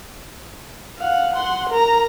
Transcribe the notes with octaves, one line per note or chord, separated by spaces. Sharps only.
F5 F#5
F#5 C6
A#4 A#5